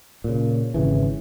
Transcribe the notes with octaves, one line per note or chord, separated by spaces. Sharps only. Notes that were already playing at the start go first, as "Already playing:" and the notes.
A#2 C#3
G#1 C#3 E3